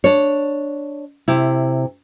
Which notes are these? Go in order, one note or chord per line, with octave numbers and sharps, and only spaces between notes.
D4 C#5
C3 E4